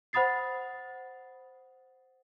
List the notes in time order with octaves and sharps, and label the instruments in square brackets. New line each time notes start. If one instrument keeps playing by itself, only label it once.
[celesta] C5 F#5 B5 D#6 A6 C7